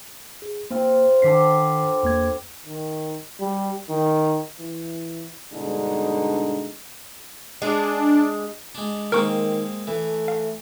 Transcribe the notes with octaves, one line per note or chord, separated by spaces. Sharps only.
G#4
A#3 C4 F4
D3 D#3 G4 A4 B6 C7
E2 A#3 G#6
D#3
G3
D#3
E3
G2 B2 D3 G#3 D4 D#4
G#3 D4 G#4
G#3 D4
D#3 G#3 A#3 C4 A#4 C#6
E3 A3
F5